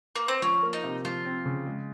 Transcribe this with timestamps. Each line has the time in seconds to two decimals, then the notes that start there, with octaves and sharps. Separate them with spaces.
0.16 A#3
0.28 C4
0.42 F3 C#4
0.63 A#3
0.73 D#4
0.84 C3
1.05 F3 F4
1.25 C4
1.45 C#3
1.66 G#3